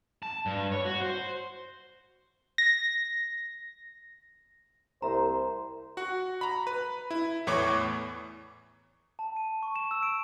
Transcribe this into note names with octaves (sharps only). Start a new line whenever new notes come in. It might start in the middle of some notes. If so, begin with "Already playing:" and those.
A5
G2
C#5
F#4
C5
A#6
C2 A#4 C5 E5 A#5
F#4 F#5
A#5 B5
B4
E4
E2 A2 E3 C#5 C#6 D6
A5
D#7
C#6
E7
E6
D7